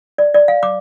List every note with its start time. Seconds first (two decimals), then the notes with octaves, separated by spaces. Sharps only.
0.18 D5
0.34 D5
0.48 F5
0.63 D6